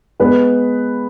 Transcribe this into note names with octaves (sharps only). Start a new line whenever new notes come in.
G#3 B3 G#4 B4